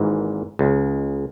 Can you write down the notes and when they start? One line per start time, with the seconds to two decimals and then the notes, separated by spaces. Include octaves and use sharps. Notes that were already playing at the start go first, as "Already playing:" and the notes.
Already playing: G#1 G#2 E3 A#3
0.59 C#2 C#3 G#3